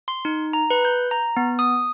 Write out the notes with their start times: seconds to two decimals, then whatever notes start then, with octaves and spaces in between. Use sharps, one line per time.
0.08 C6
0.25 D#4
0.53 A#5
0.70 B4
0.85 G6
1.11 A#5
1.37 B3
1.59 D#6